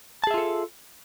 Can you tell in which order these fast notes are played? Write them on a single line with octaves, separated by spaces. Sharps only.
A5 G#4 E5 F4 A4